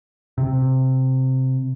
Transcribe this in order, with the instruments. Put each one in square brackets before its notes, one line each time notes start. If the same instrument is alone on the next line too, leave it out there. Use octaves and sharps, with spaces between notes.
[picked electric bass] C3